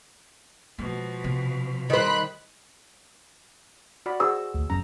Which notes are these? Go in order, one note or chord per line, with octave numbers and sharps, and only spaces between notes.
B2 F3 G#3
C3 C4
D#3 G3 C5 B5 F#6
F#4 D5 B5
F#4 G#4 C5 E6
D2
F1 F#2 C#4 A#5